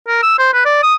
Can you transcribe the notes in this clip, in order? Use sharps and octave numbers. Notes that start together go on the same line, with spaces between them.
A#4
E6
C5
B4
D5
D#6